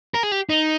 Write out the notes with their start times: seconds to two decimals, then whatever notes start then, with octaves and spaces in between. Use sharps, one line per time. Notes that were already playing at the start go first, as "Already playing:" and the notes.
0.14 A#4
0.23 G#4
0.32 G4
0.50 D#4